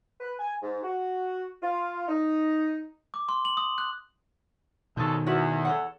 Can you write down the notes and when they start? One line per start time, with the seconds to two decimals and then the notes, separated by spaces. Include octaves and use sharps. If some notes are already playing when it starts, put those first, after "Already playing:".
0.20 B4
0.40 G#5
0.63 G#2
0.83 F#4
1.63 F4
2.08 D#4
3.14 D6
3.29 C6
3.45 F#7
3.57 D#6
3.78 F#6
4.97 C#2 B2 D#3 G#3 A4
5.26 E2 E4 F#4 B4
5.65 A4 C#5 F#5